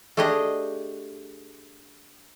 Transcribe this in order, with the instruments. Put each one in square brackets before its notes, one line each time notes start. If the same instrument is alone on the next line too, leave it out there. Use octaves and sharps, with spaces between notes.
[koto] A3 D4 G4 G#4 D#5